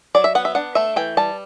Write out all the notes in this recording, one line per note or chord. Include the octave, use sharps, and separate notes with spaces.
F#3 D5
E5
B3 F#5
E5
D4 F#5
A3 E5
E3 G5
G3 A5